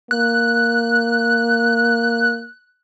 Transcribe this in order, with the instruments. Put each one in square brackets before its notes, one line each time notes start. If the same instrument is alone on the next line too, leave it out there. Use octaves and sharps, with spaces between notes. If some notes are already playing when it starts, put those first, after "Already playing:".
[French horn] A#3 [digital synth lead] F#6